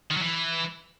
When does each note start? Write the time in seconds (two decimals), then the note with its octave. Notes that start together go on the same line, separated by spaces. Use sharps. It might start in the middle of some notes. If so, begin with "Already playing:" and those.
0.10 D#3
0.16 F#3
0.22 E3